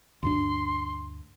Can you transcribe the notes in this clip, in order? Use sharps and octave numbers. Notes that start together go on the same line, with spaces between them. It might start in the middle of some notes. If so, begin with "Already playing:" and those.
D2 G2 D4 C6